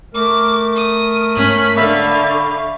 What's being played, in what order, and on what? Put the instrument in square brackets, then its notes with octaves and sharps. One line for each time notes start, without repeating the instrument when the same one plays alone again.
[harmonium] A3 A#4 [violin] D6
[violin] D#6
[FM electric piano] G#2 [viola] C#4 [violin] F#6 B6
[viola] D3 [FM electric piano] E5 B5 C#6 [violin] F5